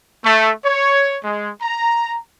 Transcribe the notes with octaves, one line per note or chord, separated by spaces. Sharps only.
A3
C#5
G#3
A#5